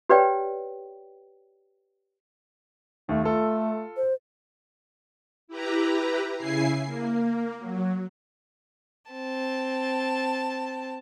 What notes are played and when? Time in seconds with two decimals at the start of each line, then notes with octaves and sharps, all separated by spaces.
0.09 G4 B4 C#5 D5 G5
3.09 D#2 A3
3.24 A3 F4 A4
3.97 C5
5.48 E4 G4 B4 A#5
6.37 C#3 E4 G#5 C7
6.85 A#3
7.59 F#3
9.11 C4 A5